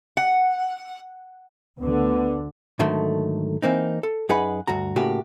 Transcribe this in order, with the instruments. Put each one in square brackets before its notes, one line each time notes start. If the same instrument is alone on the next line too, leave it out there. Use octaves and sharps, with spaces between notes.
[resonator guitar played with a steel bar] F#5
[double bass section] D2 D3 [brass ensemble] B3
[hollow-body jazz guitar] G#2 D3 D#3 F#3 A3
E3 A#3 C4 D#4
A4
F#2 D#4 G#4 B4 F#5 B5
D2 G2 F#4 A#5
A2 C#3 A#3 F#4 G4